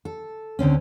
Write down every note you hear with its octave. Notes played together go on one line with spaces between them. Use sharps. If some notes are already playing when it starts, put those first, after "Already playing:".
A4
D2 D3 C4 C#4